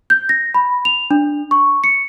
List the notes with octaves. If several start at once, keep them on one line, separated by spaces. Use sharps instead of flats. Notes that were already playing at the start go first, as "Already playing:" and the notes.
G6
A#6
B5
F7
D4
C#6
C#7